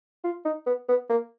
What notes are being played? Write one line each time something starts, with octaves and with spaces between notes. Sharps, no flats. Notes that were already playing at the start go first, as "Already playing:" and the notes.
F4
D#4
B3
B3
A#3